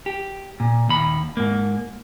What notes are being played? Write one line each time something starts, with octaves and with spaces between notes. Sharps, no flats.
G4
A#2
D#2 B5
G#2 A#3